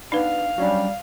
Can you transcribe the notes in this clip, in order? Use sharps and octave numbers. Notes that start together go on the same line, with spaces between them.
B3 D4 D#4 B4 F5
F#3 G3 C#4 D4